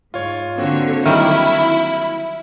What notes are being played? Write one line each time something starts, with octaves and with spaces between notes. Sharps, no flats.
G#2 F4 C#5
D3 A#3 C4 F#4 C#5
D#3 F#3 G3 E4 E5 F6